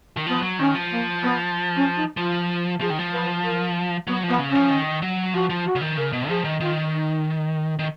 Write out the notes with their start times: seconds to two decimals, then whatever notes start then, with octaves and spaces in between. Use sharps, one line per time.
0.17 D#3
0.27 F3 B3
0.42 F#3
0.59 D#3 C#4
0.75 F3
0.90 A#3
1.22 B3
1.75 C#4
1.95 D#4
2.17 F3 F4
2.80 F3 G#4
2.90 D#3
2.99 F3
3.13 B4
3.43 A#4
4.07 F#3 B3
4.23 F3 B3
4.39 C#3
4.49 C#4
4.55 F3
4.70 D#3
5.02 F#3
5.34 F3 F#4
5.50 F3
5.65 F#4
5.75 C#3
5.81 D#3
5.96 C#3 A#4
6.13 B2
6.28 F3 G#4
6.44 D#3
6.60 D#3 F4
6.93 D#4
7.79 D#3